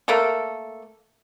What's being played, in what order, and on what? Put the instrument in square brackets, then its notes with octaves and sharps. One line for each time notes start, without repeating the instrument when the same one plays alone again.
[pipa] A3 A#3 A4